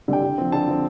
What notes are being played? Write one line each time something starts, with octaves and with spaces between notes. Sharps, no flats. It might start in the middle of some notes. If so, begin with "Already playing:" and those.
D3 G3 D4 G5
D3
F3 C4
D3 A5
F3 C4